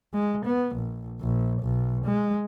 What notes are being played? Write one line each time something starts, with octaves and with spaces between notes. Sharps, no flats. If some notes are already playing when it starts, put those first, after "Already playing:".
G#3
B3
A#1
A#1
B1
G#3